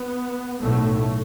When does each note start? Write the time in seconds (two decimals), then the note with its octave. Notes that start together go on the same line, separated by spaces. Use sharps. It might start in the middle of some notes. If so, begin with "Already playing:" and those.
Already playing: B3
0.60 B1 A2 A3